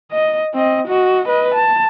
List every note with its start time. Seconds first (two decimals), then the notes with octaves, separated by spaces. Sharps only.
0.11 D#5
0.53 C4 D#5
0.87 F#4 D#5
1.25 B4 D#5
1.54 A5